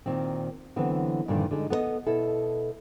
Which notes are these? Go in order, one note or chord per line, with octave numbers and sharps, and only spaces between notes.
A#2 D#3 C4
D3 E3 F#3 B3 C4
G2 A#2 D3 D#3 F3
D3 G#3 D#4
B3 A4 B4 D#5
B2 E4 A4